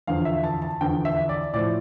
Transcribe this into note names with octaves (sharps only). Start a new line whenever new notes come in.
E2 D3 F3 F5
E5
A5
A5
E2 D3 F3 G5
E5
D5
A2 F3 D5